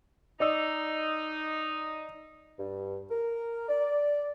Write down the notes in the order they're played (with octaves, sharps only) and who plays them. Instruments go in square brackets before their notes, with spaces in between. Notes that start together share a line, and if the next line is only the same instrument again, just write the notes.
[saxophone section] D#4 [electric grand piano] D5 D#5 E6
[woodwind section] G2
A#4
D5